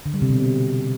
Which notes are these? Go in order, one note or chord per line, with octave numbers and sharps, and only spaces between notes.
D3
G3
C3
B2